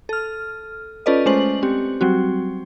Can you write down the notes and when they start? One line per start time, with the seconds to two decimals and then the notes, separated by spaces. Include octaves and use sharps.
0.09 A4 F6
1.06 C#4 F4 A4 B4 D5 D#5
1.26 G#3 A3 C#4 C5 F#7
1.63 C4 G4
2.01 F#3 G3 C4 F#4